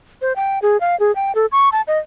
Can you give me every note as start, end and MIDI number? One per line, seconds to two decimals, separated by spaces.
0.22 0.35 72
0.36 0.59 79
0.62 0.80 68
0.80 0.98 77
1.00 1.14 68
1.15 1.34 79
1.35 1.46 69
1.52 1.69 85
1.72 1.81 81
1.87 1.98 75